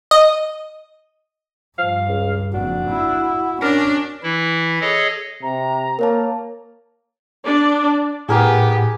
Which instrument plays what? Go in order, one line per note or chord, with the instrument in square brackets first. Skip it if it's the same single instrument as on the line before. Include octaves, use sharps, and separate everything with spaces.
[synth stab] D#5
[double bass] G2 [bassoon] F3 [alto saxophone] F5
[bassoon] C#2
[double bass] F#1 F2 [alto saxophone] D4 [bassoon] F#4
[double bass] E4
[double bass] C#4 [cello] D4 [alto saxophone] A#4
[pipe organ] E3 E4
G#4 A4 C#5 D#5
[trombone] C3 [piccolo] A#5
[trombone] A#3 [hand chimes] A#4 C#5 A5
[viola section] D4 D5
[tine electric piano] A2 [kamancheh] B3 G4 [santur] G#4 A#4 G#5